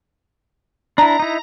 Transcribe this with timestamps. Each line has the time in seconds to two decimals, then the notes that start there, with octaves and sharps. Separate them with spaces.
0.98 D4 E4 A#5
1.20 D#4 E4